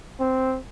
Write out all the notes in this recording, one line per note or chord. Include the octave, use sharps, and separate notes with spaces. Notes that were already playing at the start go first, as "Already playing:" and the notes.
C4